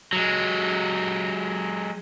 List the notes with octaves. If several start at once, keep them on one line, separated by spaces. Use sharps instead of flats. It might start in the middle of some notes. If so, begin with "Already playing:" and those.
F#3 G#3